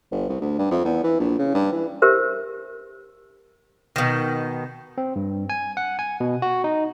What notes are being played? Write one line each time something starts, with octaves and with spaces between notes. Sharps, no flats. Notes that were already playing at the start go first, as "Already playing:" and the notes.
G1
C2
D2
G2
F2
E2
E3
A#1
C#3
G2
E3
G4 A#4 C5 E5
B2 D#3
C4
G2
G#5
F#5
G#5
B2
F#4
D#4